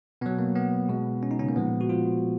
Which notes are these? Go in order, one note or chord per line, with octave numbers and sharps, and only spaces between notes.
B2 F#3 B3
A#3
B3
B2 G#3
C#4
D#4
C#3 C#4
A#3
A#2 F3 G#3 B3
F#4
F3 F4